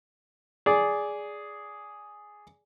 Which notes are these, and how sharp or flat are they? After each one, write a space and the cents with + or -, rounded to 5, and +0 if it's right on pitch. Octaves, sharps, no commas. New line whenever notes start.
G#4 +0 D5 -10